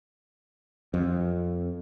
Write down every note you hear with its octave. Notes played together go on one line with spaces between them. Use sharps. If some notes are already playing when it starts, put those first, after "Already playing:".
F2